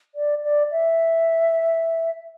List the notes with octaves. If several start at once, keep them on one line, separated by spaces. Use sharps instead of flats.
D5
D5
E5